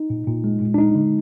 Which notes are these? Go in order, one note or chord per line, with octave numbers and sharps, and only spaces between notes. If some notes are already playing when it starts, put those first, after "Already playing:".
Already playing: D#4
A#2
A#2
G#3
A#2
D4
G#3 D#4
D3